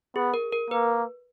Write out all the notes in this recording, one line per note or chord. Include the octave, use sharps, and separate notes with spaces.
B3 G#4
A#4
A#4
A#3 B4